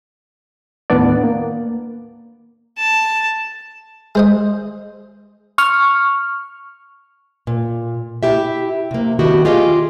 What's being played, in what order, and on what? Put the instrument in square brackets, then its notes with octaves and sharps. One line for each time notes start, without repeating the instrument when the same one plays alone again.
[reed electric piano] D#2 A2 B3 D4 D5
A#3
[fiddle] A5
[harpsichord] G#3 C5 D#5
[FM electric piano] C#6 F6
[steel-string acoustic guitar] A#2
E4 G4 E5
C3 A#3
D#3 B3 E4 F#4 G4
F4 G4 G#4 D#5 F5